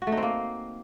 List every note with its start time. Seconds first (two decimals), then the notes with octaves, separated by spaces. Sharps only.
0.02 F#4
0.07 A3
0.12 D#4
0.17 C4
0.23 A#3